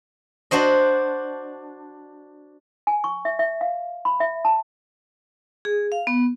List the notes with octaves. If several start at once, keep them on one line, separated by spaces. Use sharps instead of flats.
D4 F#4 C5 D#5
G#5
C#6
E5
E5
F5
B5
E5
A5
G#4
F5
B3